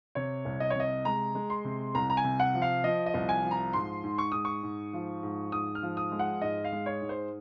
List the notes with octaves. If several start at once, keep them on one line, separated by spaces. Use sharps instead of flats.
C3 C#5
C2
D#5
C#5
C3 D#5
G#3 A#5
G#3
C6
C3
C2 A#5
A#5
G#5
C3
F#5
F3
F5
F3 D#5
D#5
C2
G#5
F3
A#5
G#2 C6
G#2
C#6
G#2 D#6
C#6
G#2
F3
G#2
G#2 D#6
F6
F3
D#6
G#3
F#5
G#2 D#5
F5
G#3
C#5
G#2
C5